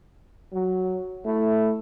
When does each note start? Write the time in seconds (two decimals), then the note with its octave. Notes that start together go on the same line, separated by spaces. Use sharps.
0.52 F#3
1.24 A3 E4